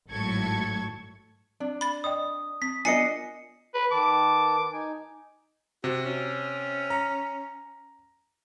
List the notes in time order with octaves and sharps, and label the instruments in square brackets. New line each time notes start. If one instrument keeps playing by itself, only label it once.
[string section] G#1 A2 F#3 A4 C#6 G#6
[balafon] C4 [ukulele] D4
[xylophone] B5 A6
[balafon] D5 D#5 G5 [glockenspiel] D#6
[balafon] C4 [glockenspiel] B6
[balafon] B3 F4 A#4 [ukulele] D4 D#5 [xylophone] G#5 [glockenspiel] C7 C#7
[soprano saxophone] B4
[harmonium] D#3 B4 A5 [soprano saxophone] D6
[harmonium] D#4 G#5
[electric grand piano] C3 [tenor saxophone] F#4
[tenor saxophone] C#4
[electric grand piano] A#5